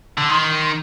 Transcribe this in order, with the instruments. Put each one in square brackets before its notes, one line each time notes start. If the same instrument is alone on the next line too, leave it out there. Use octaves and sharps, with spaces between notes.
[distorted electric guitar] D3
[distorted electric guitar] D#3 [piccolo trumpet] C6